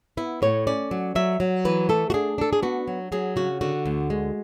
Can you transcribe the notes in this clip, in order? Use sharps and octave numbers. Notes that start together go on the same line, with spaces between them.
B3 E4
A2 C#5
C#4 D5
F#3
F#3 E5
F#3
E3 B4
A3 A4
F#4
D4 G#4
D4 A4
G#4
B3 F#4
F#3
F#3 G#4
C#3 F#4
D3 F#4
D2
G#3